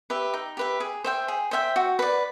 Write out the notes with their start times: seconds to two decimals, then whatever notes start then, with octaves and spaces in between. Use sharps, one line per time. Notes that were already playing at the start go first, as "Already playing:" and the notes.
0.10 G4 B4 E5
0.34 D#4
0.57 G4 B4 E5
0.80 G#4
1.04 C5 E5 G5
1.28 G#4
1.51 C5 E5 G5
1.76 F#4
1.99 B4 D5